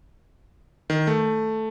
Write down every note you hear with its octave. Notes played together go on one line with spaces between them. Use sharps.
D#3
A3